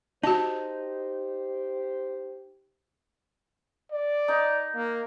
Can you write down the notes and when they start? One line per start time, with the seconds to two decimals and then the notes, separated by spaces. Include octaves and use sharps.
0.23 D#4 F#4 G4 C5 A5
3.92 D5
4.28 D#4
4.75 A#3